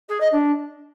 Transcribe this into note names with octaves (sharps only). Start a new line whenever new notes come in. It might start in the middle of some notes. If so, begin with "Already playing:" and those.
G#4
D#5
D4